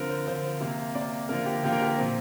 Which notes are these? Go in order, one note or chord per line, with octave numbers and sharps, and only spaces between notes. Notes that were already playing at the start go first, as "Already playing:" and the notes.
Already playing: D3 F3 C4 A#4
C5
D3 F3 C4 C5
C3 A#3
C3 A#3 D5
D3 F3 A#3 A#4
G4
D3 F3 A#3 G4
A#4
G4
A#4
A#2 F3 C4